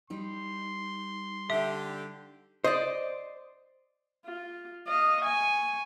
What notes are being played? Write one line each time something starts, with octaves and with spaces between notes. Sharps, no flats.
G3 D#4 C6
D3 G4 E5
C5 D5 D#5
F4
D#5 F5
G#5 C#6